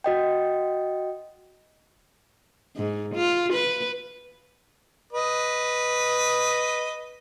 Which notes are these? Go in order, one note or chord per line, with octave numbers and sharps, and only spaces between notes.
F#4 D#5 G5
G#2
F4
B4
B4 D#5